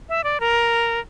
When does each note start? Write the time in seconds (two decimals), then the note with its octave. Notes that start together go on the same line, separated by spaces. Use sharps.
0.09 E5
0.24 D5
0.40 A#4